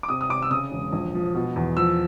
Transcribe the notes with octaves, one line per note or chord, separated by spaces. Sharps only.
D6
C3 D#6
D#6
C3 D6
E6
C#3 D#6
E1
A#1
F3
B2
E2
F3 E6